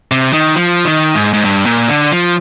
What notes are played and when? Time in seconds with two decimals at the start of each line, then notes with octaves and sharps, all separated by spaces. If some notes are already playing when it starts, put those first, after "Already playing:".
0.11 C3
0.33 D#3
0.55 F3
0.85 D#3
1.15 G#2
1.34 G#2
1.44 G2
1.66 A#2
1.88 D3
2.11 F3